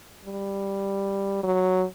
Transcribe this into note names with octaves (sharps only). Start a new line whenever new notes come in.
G3
F#3